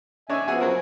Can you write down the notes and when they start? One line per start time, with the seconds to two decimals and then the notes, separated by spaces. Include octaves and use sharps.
0.30 D4 D#4 C#5 E5 G#5
0.48 F3 B3 F#4 G#4 G#5
0.61 F#3 C4 A#4